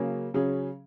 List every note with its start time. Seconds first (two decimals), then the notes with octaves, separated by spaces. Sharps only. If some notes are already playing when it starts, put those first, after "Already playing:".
Already playing: C#3 F#3 A#3 C#4 G#4
0.34 C#3 F#3 C#4 G#4